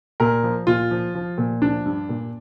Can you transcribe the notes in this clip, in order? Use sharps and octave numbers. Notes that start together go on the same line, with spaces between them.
A#2 A#4
F3
A#2 F4
F3
F3
A#2
F3 D4
G2
A#2